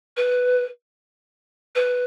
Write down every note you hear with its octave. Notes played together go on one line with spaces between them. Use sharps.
B4
B4